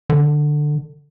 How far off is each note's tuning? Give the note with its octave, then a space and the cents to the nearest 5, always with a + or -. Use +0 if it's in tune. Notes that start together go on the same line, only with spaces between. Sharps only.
D3 +15